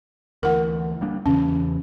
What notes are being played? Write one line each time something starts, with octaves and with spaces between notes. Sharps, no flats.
D2 E3 A#4 F#5
G3 A#3 D4
E2 C#3 E3 C#4